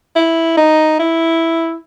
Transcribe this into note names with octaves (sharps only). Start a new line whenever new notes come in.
E4
D#4
E4